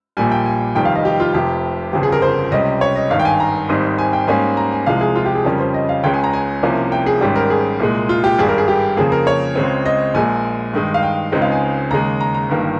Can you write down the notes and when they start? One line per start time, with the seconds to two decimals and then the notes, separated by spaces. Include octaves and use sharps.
0.17 A#1 A#2 G3 G#5
0.32 G5
0.46 G#5
0.75 F1 F2 D#3 G3 G5
0.85 F5
0.95 D#5
1.05 G4
1.20 F4
1.34 F1 F2 C3 G4
1.93 G1 F2 C#3 G4
2.03 G#4
2.12 A#4
2.22 C5
2.51 C#2 C3 G3 C#4 D#5
2.81 C#5
2.96 D#5
3.10 G#1 G2 D#3 F5
3.19 G5
3.25 G#5
3.40 A#5
3.69 G#1 G#2 G3 C4 D#4
3.99 G#5
4.13 G5
4.27 G#2 G3 A#3 C#4 G#5
4.57 A#5
4.72 G#5
4.86 C2 C3 F3 G#3 F5
5.01 G#4
5.16 F4
5.26 G4
5.35 G#4
5.45 F2 C#3 G3 C#4 A#4
5.60 C5
5.74 D#5
5.89 F5
6.04 C#2 C#3 G#3 C#4 G5
6.14 G#5
6.24 A#5
6.33 G#5
6.63 C2 C3 F3 A#3 C#4
6.92 G5
7.06 G#4
7.21 G#1 G#2 G3 C#4 G4
7.36 A#4
7.50 G#4
7.80 C2 A#2 G#3
8.09 F4
8.24 G4
8.38 G#1 G2 G3 G#4
8.49 A#4
8.58 G#4
8.68 G4
8.97 F2 C#3 F3 A#3 G#4
9.12 A#4
9.27 C#5
9.55 C#2 C#3 G#3 C4
9.86 D#5
10.14 A#1 A#2 G#3 G#5
10.73 G2 D#3 G#3 D#4
10.94 F5
11.03 G5
11.32 C#2 C#3 G#3 C4 D#4 D#5
11.42 F5
11.52 G#5
11.91 D#2 C#3 G#3 A#5
12.21 A#5
12.35 A#5
12.49 G1 G2 D#3 A#3